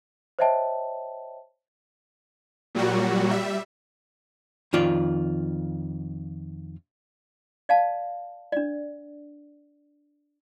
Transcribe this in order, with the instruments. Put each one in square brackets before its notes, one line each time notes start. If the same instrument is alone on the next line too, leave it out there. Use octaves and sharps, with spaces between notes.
[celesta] C5 C#5 D#5 E5 G5 A5
[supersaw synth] A#2 F#3 G3 F#4
G3 E5
[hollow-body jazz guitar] F2 D#3 F4 D5
[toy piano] D5 F5 A5
D4 D5